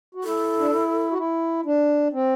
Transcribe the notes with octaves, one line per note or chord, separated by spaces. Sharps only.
F#4
E4 A4
D4
E4
F#4
E4
D4
C4